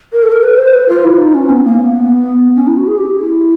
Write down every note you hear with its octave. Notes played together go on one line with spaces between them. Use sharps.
A#4
A4
A#4
B4
C5
B4
F4
E4
D#4
C#4
B3
A#3
B3
C#4
E4
F#4
G#4
G4
E4